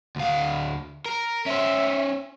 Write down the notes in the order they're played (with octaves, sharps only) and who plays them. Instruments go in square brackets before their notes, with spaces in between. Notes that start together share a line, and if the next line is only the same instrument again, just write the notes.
[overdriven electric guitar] D2 F5
A#4
[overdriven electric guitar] C#4 C5 [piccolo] E5